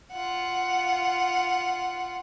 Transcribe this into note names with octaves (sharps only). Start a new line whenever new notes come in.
F4 F#5